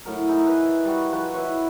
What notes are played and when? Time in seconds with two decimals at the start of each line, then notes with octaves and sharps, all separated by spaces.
0.05 A2 F#3 A#4
0.29 D#4 E4 G#4
0.47 B4
0.85 G3 F#4
1.12 F3 F#4 B4
1.34 E4 B4 C#5